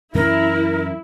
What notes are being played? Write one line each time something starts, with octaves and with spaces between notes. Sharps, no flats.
F#2 E3 C#4 E4 A#4